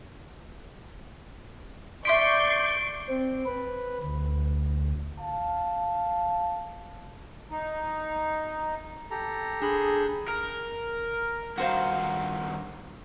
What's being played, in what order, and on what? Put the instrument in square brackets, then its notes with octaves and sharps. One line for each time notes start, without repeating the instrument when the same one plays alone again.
[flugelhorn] D5 [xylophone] E5 C6 B6 [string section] C#6 G6 C7 [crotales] D7
[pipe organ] C4
B4
D2
[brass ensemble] F5 A5
[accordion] D#4
[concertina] G4 A4 [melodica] A#5
[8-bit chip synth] D4 B5 G6 [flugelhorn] G#4
[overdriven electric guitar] A#4
[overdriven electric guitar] G2 D#3 [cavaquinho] F#4 C5 F5